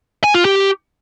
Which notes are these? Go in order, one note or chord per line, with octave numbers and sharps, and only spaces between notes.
G#5
F4
G4